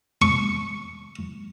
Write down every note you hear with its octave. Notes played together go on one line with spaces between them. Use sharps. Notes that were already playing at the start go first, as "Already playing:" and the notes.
C#6